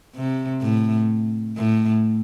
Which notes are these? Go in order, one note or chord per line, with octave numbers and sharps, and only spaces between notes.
C3
A2
A2